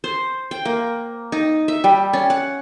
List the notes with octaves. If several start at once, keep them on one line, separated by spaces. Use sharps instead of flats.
C5
G5
A#3
D#4
E5
G3
C#4
F#5